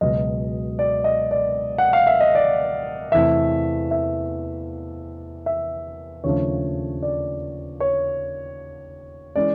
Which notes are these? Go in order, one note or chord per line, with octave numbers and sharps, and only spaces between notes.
C#2 B2 F#3 D#5
D5
D#5
D5
F#5
F5
E5
D#5
D5
E2 C3 E3 A3 E5
E5
E5
D#2 C#3 F3 A3 D4 C#5
D5
C#5
E3 G#3 C#4 D5